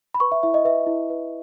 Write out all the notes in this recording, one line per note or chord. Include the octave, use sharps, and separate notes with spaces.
B5
B4 C#6
E5
E4 E5
D#5
B4 E5
E4
B4